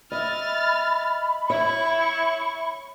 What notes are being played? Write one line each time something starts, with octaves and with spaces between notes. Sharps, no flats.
D#5 E5 B5 F6 A6
E4 C#5 E5 C#6